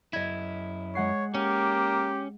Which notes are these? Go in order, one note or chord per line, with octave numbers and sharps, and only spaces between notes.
F#2 E4 D#5 G#6
G#3 C#5 F#5 C7
A#3 C#4 G4